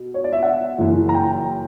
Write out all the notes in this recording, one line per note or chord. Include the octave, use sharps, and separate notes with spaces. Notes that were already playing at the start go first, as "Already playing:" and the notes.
Already playing: B2
C#5
D5
E5
F#5
F#1 F#2 E3
A#5
G5